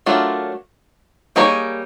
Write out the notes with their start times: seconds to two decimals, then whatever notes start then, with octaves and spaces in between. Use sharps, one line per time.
0.06 F#3 A3 D4 F4 A#4
1.36 G3 A#3 D#4 G#4 C#5